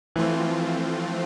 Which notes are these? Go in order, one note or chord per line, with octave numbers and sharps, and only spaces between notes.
E3 F3 A3 C4 F4